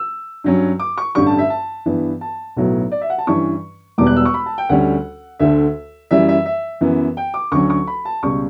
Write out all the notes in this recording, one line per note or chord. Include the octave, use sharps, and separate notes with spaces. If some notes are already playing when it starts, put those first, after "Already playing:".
Already playing: E6
G2 F#3 C#4
D6
C#6
A1 G2 D3 G3 C#6
A5
E5
A5
G2 E3 B3
A5
B1 A2 F#3 B3
D5
E5
F#5
A5
G2 E3 G3 C#4 C#6
E1 E2 B2 G3 B3 D6
F#6
E6
C#6
B5
A5
G5
D2 D3 G3 C#4 F#5
D2 D3 A3 E5
F#2 E3 G3 E5
E5
E5
F#2 E3 B3
G5
D6
D2 D3 F#3 C#4 C#6
C#6
B5
A5
C#2 B2 G3 C#6